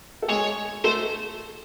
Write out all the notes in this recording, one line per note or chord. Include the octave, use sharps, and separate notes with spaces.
A4
G#3 G#4 C#5
A3 A4 C5